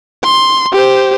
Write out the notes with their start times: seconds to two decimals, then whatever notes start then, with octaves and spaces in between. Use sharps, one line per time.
0.24 C6
0.73 G4 C5